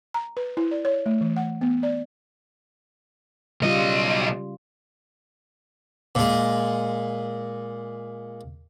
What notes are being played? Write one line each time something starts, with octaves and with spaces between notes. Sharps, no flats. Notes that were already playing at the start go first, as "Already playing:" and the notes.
A#5
B4
E4
D5
C#5
A3
E3
F#5
B3
D5
B1 C#3 G3 F4 D#5
A#2 G#3